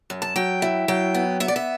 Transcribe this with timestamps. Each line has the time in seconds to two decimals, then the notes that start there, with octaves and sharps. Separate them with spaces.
0.10 F#2
0.22 A5
0.36 F#3 G5
0.62 E4
0.88 F#3 G5
1.14 B3
1.40 B3 E5
1.48 D5
1.56 E5